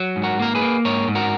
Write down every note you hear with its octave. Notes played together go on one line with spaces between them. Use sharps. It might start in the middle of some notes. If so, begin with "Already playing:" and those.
Already playing: F#3
G#2
F#4 A#4
A#3 A#4
G#4 B4
A#3
G#2 A#4 C#5
G#2
F#4 A#4